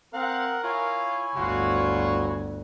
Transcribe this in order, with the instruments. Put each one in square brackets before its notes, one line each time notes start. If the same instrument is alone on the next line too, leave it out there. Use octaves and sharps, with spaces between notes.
[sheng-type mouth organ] C4 F5 F#6 [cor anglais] A#4 [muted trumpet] F#5
[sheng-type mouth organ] E4 C#5 G#5 [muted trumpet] F4
[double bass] G1 D2 [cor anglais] F4 [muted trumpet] F#4